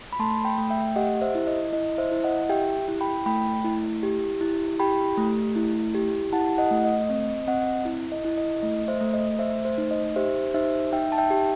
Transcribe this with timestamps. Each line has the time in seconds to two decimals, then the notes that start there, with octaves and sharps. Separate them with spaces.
0.13 B5
0.19 A3 A5 C6
0.45 G5 B5
0.58 A3
0.70 E5 G5
0.96 G4 D#5 F#5
1.21 C5 E5
1.35 E4
1.47 D#5
1.73 E4 D#5
1.98 C5 E5
2.11 E4
2.24 D#5 F#5
2.49 G4 E5 G5
2.88 E4
3.01 G5 B5
3.26 A3 G5 B5
3.65 E4
4.03 G4
4.41 E4
4.79 G4 G5 B5
5.17 A3
5.56 E4
5.95 G4
6.33 E4 F#5 A5
6.58 D#5 F#5
6.71 A3
6.84 D#5
7.09 C4 D#5
7.47 C4 D#5 F#5
7.85 E4
8.12 D#5
8.24 E4
8.38 D#5
8.62 A3 D#5
8.88 C5 E5
9.01 A3
9.14 D#5
9.39 A3 C5 E5
9.65 C5
9.78 D#4
9.91 D#5
10.16 G4 C5 E5
10.54 D#4 C5 E5
10.93 D#4 E5 G5
11.12 A5
11.18 E5 G5
11.31 G4